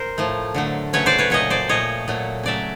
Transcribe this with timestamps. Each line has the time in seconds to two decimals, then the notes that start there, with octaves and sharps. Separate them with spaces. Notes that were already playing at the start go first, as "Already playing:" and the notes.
Already playing: A#4 C5
0.18 A2 F3 A3
0.55 D3 F#3 A3
0.93 C#3 F#3 A3 B4 C#5
1.06 C5 D5
1.18 B4 C#5
1.30 A#2 F#3 A3 C#5 D#5
1.50 C5 D5
1.69 A#2 F3 A3 C#5 D#5
2.08 A#2 F#3 A3
2.43 C#3 F#3 A3 D5 E5